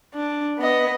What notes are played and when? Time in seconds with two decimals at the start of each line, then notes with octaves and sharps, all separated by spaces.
0.14 D4
0.58 B3 D#5